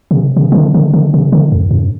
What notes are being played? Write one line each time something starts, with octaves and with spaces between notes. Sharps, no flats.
C3
C3
E3
D3
D3
D3
C3
D3
E2
F#2